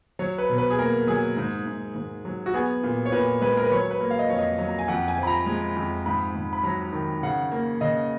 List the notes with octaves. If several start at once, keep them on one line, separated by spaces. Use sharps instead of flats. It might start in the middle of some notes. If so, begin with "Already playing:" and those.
F#3 C#5
B4
B2
B4
G#4
A#3 A#4
F#3 G#4
G#2
G#2
G#2
F#3
F#4
B3 G#4
A#2
C#5
A#2 B4
G#3 B4
A#4
B4
F#3 C#5
B4
A#3
F5
D#5
F2 C#5
D#5
F#3
A#5
G#5
F2 F#5
G#5
F3 B5
A#5
G#3
F2
G#2 B5
G#2
B5
F#3 A#5
D#3
C#3 F#5
A#3
C#3 D#5